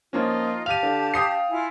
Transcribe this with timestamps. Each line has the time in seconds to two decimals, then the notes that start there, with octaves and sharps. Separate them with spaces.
0.13 F3 A#3 C#4 D#4 F4
0.66 G4 F5 A5 D#7 F7
0.83 D3
1.14 G5 D#6 C7
1.51 E4 F4 G#5